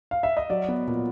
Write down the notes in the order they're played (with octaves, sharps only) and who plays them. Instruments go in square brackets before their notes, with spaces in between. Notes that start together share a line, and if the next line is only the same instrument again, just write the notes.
[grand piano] F5
E5
D#5
F#3 D5
B3
A#2